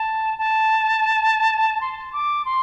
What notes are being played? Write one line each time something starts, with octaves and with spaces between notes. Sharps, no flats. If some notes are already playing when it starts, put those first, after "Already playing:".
Already playing: A5
A5
C6
D6
C6